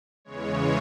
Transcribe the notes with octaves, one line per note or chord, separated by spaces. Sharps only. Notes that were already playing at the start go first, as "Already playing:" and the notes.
E2 C#3 E3 G#3 C#5